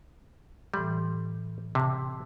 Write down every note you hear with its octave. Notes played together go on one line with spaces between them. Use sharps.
A2 E3 G3 C6
C3 A5 D6